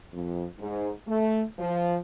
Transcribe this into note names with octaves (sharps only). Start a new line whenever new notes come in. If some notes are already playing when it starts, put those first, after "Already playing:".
F2
G#2
A3
F3